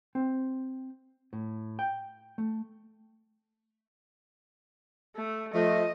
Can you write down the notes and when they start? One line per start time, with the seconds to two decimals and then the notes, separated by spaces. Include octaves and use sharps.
0.15 C4
1.33 A2
1.79 G5
2.38 A3
5.16 A3
5.54 F3 A3 D#5